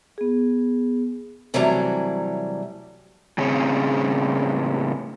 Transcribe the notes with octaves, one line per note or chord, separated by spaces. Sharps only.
B3 G#4
C3 E3 F#3 G3 A3 A#5
A2 C#3 C4 C#4 G#4 C#5